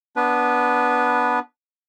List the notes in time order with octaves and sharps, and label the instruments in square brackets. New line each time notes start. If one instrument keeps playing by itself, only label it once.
[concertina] B3 D4 B4